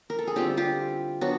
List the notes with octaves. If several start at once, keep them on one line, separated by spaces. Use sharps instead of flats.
A#4
A4
G#4
D3 G3 C4 E4 F4 G4
F4 G4
F#3 B3 D4 F#4